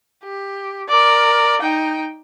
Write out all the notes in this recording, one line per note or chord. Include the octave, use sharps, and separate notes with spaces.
G4
A#4 D5
D#4 G5